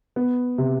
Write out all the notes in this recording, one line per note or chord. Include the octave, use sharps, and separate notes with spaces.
B3
C3